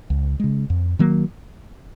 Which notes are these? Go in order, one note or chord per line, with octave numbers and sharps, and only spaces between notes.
C#2
C#3 G#3
F2
D#3 F#3 A#3